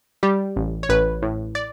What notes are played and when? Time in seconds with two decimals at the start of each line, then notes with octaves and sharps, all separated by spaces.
0.23 G3 G4
0.56 A1
0.83 C#5
0.89 A1 B4
1.22 A2
1.55 D5